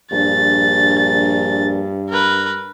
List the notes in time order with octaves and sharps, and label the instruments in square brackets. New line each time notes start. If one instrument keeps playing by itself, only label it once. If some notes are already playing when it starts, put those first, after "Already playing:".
[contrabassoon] A#1 [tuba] G2 [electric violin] A6
[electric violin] A#4 B4